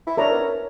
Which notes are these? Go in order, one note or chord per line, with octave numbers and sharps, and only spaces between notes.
E4
D4 A#4 C#5 E5 A#5
B3
C#4